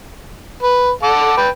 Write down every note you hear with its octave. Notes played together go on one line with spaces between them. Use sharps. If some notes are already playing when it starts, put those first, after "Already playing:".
B4
A4 F#5 D6
B4 G5